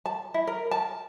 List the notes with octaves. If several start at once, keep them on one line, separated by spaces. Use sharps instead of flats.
A5
E4
A#4
A5